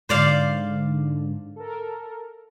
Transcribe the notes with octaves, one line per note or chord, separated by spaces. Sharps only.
G#2 D3 C5 D5 F5
A4 A#4